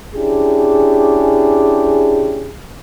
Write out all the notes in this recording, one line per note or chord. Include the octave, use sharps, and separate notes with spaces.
C#4 D4 E4 G4 G#4